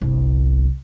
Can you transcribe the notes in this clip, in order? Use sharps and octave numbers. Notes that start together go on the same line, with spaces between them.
G1 C2